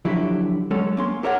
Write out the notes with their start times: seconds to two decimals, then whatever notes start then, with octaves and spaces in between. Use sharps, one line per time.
0.05 D3 F3 F#3 E4 G4
0.71 F#3 G#3 C#4 A4 C#5
0.97 A#3 C#4 C6
1.23 G4 A4 A#4 C#5 D#5 F#5